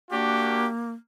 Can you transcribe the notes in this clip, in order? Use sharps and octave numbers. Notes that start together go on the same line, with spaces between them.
A#3 D4 F#4 G4